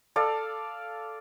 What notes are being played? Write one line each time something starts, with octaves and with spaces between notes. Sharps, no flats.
A4 D5 F5